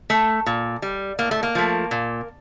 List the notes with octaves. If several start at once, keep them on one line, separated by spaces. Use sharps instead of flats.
A3
A#2
G3
A2 A#3
A3
A#3
F3 A3
A#2